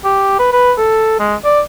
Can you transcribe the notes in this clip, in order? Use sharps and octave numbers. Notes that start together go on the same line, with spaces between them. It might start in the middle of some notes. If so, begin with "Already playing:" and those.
G4
B4
B4
A4
G#3
D5